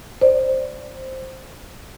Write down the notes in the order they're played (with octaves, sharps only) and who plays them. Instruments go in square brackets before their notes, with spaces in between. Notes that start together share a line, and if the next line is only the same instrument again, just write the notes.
[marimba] C5 D5